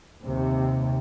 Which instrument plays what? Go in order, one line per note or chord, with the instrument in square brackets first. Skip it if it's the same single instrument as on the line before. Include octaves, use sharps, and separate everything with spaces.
[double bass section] D#2 C3